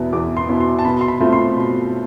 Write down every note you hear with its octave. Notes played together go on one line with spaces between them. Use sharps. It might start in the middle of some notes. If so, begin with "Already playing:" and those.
Already playing: E2 B2 B3 E4
E2 D6
C6
B2 B3 E4
C6
A5
B2 B5
C6
B5
A3 C4 F4
C6
B2